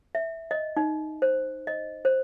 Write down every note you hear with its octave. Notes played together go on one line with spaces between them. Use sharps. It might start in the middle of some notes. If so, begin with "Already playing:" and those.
E5
D#5
D#4
C5
D#5
C5